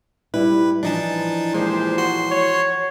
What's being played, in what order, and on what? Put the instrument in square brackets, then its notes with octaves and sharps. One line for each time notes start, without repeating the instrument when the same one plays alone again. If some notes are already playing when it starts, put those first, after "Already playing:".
[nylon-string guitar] G3 E4 [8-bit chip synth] B4
[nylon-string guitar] E3 F3 [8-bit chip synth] D4 D#4 A5
[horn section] A#2 G4 C5 [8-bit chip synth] G#3
[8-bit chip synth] F#4 C6 C7
[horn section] C#5